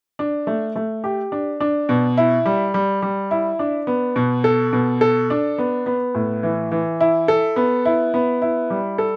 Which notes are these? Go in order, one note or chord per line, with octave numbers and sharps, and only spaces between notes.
D4
A3
A3
G4
D4
D4
B2
E4
G3
G3
G3
E4
D4
B3
B2
A4
B2
A4
D4
B3
B3
A2
E3
E3
E4
A4
B3
E4
B3
E4
G3
A4